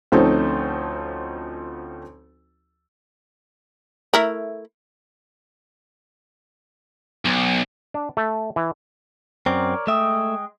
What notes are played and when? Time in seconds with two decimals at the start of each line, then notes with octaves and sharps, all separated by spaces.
0.12 D2 F3 C4 C#4 D#4 A4
4.14 A3 E4 A#4
7.26 B1
7.94 D4
8.17 A3
8.56 E3
9.46 F#2 C4 A#4 C#5 D5
9.87 G#3 A3 E5 G5 D#6